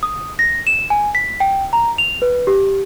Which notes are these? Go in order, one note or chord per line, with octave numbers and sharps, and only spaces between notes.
D#6
A#6
E7
G#5
B6
G5
A#5
F7
B4
G4